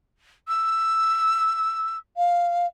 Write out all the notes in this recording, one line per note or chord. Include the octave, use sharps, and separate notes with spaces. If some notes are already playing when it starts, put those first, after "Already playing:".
E6
F5